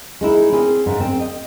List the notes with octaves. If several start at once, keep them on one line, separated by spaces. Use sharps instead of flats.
G#3 D#4 E4
C4 C#4 G#4
G#2 C#3
C4
D#5